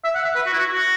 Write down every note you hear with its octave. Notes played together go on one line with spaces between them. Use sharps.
E5
F#5
E5
B4
F#4
E4
F#4
F#4